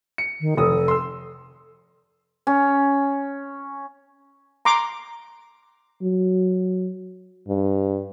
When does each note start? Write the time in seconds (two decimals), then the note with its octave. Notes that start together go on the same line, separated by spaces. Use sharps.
0.18 C#7
0.41 D#3
0.57 F1 A4 D#6
0.88 C6 E6
2.47 C#4
4.65 A#5 C6 D6
6.02 F#3
7.48 G2